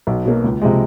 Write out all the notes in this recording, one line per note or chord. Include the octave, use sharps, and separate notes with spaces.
B1
B2 F#3 A#3
C#2
C3 F3 G#3